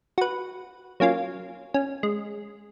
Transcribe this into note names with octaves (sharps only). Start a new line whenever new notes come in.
F#4 B4
F#3 A#3 C#4 F4
C#4
G#3